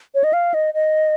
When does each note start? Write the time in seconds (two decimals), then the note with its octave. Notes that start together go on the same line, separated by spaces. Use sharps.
0.15 C#5
0.24 D#5
0.33 F5
0.54 D#5
0.74 D#5